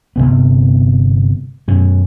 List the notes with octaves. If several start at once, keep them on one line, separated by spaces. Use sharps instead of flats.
G1 G#2 C3 B3
F#2 B2 F#3